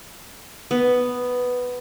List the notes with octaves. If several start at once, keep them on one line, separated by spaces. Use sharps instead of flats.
B3